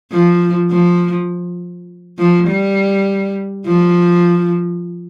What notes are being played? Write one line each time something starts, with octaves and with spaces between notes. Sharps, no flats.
F3
F3
F3
G3
F3